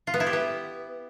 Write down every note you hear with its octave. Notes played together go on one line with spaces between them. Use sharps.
F4
B3
E4
G4
B3